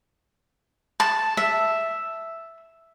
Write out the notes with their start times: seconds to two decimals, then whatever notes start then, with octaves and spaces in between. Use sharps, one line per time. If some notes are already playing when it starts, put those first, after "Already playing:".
1.00 A5
1.37 E5